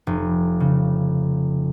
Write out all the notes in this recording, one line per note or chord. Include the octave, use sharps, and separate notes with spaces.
F1
C#3